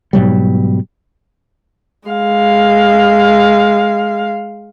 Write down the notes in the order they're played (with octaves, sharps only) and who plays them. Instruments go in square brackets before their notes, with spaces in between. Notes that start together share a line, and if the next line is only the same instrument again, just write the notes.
[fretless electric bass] G#2 B2 F#3 G3
[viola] G#3 F5